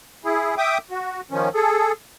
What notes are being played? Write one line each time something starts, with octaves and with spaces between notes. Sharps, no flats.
E4 G#4
E5 G5 D6 D#6
F#4
D#3 F3 C#4
G#4 A4